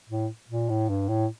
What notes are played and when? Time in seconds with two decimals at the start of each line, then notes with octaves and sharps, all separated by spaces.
0.09 A2
0.49 A#2
0.69 A2
0.89 G2
1.09 A2